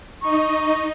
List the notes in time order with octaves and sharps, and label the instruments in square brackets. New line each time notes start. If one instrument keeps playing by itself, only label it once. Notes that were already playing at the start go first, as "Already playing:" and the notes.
[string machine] D#4 D#5 [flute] C#6